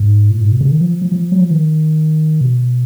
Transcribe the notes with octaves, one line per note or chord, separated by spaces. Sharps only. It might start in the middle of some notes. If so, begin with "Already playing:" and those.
Already playing: G#2
A#2
G#2
B2
C#3
D#3
F3
F3
F3
F#3
F3
D#3
B2